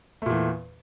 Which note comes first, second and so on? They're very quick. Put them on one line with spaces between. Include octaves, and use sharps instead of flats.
A3 A#2 E2